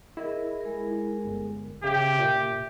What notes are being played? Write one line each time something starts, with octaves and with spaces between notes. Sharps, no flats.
E4 G#4 A#4 D#5
G#3 G#4 A#4
G1
C#3 G4 E5
A#2